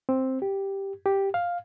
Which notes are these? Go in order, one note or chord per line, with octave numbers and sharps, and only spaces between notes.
C4
G4
G4
F5